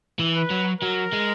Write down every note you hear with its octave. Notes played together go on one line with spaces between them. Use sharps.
E3
B4
F#3
F#3 A#4
G#3